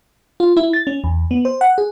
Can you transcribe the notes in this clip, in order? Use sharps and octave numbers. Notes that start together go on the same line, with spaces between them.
F4
E4
A6
C#4
E2
B3
C5
F#5
G#4